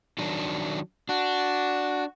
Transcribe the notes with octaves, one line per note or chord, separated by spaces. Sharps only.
D#3 F#3 D4
D4 F#4